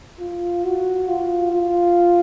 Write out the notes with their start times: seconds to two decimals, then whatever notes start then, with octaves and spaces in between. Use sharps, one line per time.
0.19 F4
0.64 F#4
1.08 F4
1.52 F4